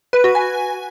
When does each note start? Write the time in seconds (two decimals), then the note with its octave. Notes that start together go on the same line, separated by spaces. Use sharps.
0.13 B4
0.24 F#4
0.35 G#5